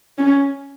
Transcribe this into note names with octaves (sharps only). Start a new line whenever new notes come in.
C#4